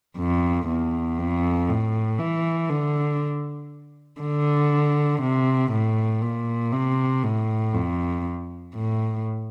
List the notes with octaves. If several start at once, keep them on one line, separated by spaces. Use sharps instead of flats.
F2
E2
F2
A2
E3
D3
D3
C3
A2
A#2
C3
A2
F2
A2